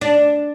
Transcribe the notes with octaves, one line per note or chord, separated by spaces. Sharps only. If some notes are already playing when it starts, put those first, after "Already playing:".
D4